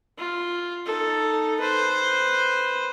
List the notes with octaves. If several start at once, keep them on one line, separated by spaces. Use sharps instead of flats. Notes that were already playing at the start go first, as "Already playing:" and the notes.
F4
D#4 A4
B4 C5